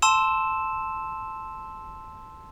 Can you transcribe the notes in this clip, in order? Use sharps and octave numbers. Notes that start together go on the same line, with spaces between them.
A5 C6 E6 E7